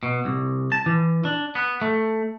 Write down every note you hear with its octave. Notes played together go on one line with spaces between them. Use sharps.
B2
C2
A5
E3
D4
B3
A3